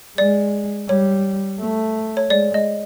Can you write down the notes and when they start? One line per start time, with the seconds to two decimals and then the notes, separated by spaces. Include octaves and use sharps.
0.18 G#3 D5
0.89 G3 C#5
1.60 A3
2.17 C#5
2.30 G#3 D5
2.54 D#5